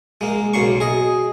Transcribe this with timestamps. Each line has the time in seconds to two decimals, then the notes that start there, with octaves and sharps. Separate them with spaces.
0.21 G#3 A#3
0.54 B1 A#3 C6 C#6
0.80 G#4 D#5